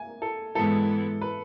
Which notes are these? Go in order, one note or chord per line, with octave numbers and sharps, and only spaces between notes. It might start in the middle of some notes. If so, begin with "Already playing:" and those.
Already playing: G#5
A4
G#2 E3 G#3 B3 E4 A4
B4